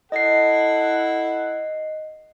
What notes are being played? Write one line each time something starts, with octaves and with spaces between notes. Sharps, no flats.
E4 A4 D#5 F#5 C7